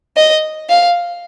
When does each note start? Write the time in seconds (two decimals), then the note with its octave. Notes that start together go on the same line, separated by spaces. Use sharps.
0.17 D#5
0.69 F5